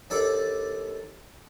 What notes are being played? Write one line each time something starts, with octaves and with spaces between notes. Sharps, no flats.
D#2 D4 A4 D5